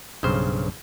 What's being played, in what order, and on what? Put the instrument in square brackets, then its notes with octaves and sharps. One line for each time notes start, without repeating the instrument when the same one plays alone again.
[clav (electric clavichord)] B1 G2 C#3 C5